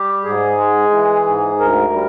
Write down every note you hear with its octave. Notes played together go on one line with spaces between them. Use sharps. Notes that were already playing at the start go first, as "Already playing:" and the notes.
Already playing: G3 G4
G#2 G#4
G#3
E3
G#2
D2 A#4
G3